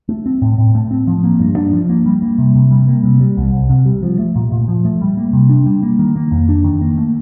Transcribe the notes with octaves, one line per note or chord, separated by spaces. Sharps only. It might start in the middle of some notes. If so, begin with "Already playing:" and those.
A3
C4
A2
A2
A3
C4
F3
A#3
G2
D4
F3
A#3
G3
A#3
C3
C3
G3
A#3
C3
G3
C2
C2
C3
G3
F3
A3
A#2
A#2
F3
A3
G3
A#3
C3
D4
G3
A#3
D#3
A#3
F2
D4
D#3
A#3
A3